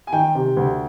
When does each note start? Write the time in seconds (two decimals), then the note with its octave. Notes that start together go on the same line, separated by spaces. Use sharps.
0.07 G#5
0.12 D#3 G5
0.35 C3
0.57 D2